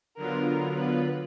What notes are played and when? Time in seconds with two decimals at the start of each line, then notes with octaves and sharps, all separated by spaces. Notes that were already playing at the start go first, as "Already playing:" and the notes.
0.17 D3 F#3 B3 F4 A#4
0.77 B4